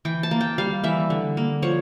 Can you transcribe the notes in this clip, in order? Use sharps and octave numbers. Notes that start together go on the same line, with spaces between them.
E3 G5
A5
A#3
G5
G3 F5
E3 E5
D3
A#3
F3 C#5